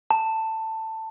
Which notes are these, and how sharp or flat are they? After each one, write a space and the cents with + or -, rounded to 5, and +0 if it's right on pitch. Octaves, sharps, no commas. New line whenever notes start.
A5 +15